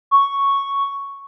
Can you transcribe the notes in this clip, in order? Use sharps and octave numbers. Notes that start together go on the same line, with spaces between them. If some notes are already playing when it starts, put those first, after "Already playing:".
C#6